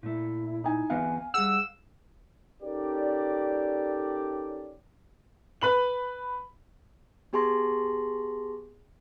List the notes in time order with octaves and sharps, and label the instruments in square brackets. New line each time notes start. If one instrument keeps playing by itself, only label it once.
[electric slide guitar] A#2 A3 [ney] E4
[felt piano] D#4 G#5 [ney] E4
[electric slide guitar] E3 B3 F4 [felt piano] F5 [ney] G#5
[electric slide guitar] G3 F#5 [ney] G#4 [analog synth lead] E6
[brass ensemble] C#4 D#4 G4 A4 A#4 D5
[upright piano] B4 B5 F#7
[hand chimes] B3 G4 G#4 A5 C6 A#6